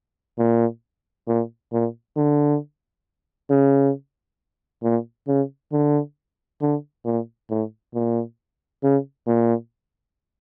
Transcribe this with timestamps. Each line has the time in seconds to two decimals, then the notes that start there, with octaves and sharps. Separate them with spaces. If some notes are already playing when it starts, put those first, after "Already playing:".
0.39 A#2
1.28 A#2
1.73 A#2
2.17 D3
3.50 C#3
4.83 A#2
5.28 C#3
5.72 D3
6.62 D3
7.05 A#2
7.50 A2
7.95 A#2
8.83 C#3
9.27 A#2